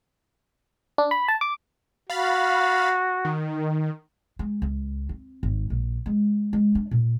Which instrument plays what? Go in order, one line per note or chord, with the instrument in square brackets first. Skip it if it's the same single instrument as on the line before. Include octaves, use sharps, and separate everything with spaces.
[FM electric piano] D4
B5
A5
D6
[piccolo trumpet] F#4 [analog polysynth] F5 B5 A6
[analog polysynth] D#3
[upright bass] G#3
C#2
C4
G#1
A#1
G#3
G#3
D4
A#2